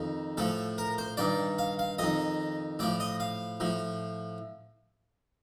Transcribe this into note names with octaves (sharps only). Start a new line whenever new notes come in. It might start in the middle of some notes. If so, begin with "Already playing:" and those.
Already playing: F2 D#3
A2 F3 A4
A#4
C5
G2 D#3 D5
F5
F5
F2 D#3 D#5
A2 F3 D5
D#5
F5
A2 F3